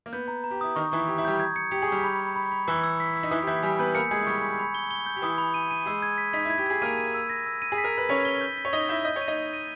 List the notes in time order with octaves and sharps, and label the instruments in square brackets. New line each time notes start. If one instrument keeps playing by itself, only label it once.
[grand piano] A#3
[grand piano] B3 [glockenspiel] G6
[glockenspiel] A#5
A#5
[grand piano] G4
[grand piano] E4 [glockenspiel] D#6
[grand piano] D#3 D#4 [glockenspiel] C#6
[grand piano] E3 E4 [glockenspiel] C#6
[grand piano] G4 [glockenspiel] C#6
[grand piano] E4
[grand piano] G3 G4 [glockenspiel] G6
[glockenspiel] G#6
C#7
[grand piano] G4 [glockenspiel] C#7
[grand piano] G#4
[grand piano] G3 G4 [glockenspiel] C#6
[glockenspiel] B5
B5
B5
B5
[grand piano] E3 E4 [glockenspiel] E6
[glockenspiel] E6
B6
E6
[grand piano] D#4
[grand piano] E3 E4 [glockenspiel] D#6
[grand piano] G4
[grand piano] E3 E4 [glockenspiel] G6
[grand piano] G3 G4 [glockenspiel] G#5
[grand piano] B3 B4 [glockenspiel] G6
[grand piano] A#3 A#4 [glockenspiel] C#7
[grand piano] G#3 G#4 [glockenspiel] G#6
[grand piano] E4
[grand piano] G3 G4 [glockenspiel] C#6
[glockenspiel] C#6
B5
G7
G7
G6
[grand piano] G4
[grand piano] E3 E4 [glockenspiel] D#6
[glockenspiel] B5
D#7
D#7
[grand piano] G#3 G#4 [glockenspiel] E6
[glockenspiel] G#6
B6
[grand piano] D#4 [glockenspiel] B6
[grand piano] E4 [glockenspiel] G#6
[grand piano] G4
[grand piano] G#4 [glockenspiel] G#6
[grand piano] A#3 A#4 [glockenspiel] D#7
[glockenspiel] D#7
E6
A#6
E6
D#7
[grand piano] G#4
[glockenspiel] B6
[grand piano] A#4
[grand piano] B4 [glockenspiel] B6
[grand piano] C#4 C#5 [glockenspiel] B6
[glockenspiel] G7
G6
B6
[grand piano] C#5
[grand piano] D#4 D#5 [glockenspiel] G7
[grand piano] E4 E5 [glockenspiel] G6
[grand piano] D#5 [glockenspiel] G6
[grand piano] C#5
[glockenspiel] D#7
[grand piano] D#4 D#5
[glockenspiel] G6
D#7